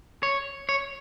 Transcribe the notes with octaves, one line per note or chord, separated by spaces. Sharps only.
C#5
C#5